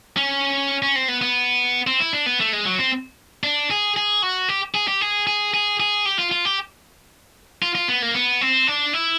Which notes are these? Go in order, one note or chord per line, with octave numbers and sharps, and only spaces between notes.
C#4
C#4
C4
B3
B3
C4
E4
D4
B3
A3
G#3
F#3
C4
D4
G#4
G#4
F#4
G4
G#4
G4
G#4
G#4
G#4
G#4
G4
F4
F4
G4
F4
F4
B3
A#3
B3
C4
D4
E4